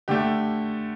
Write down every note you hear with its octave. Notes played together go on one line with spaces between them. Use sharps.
D3 A3 G4